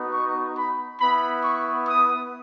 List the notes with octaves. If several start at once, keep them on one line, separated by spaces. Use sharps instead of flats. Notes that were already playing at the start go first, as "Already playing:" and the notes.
Already playing: B3 D#4 F#4
C#6
B5
B3 E4 B5
C#6
D#6